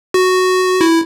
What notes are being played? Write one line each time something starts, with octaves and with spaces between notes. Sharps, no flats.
F#4
E4